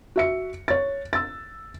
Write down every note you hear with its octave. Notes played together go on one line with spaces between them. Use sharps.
F#4 E5 C#7
C#5 A6
E6 A6